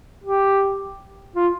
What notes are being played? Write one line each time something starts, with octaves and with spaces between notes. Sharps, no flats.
G4
F4